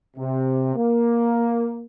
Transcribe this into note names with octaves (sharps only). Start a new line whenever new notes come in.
C3
A#3